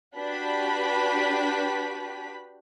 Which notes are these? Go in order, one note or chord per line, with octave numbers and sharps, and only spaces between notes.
D4 F#4 G4 B4 B5 B6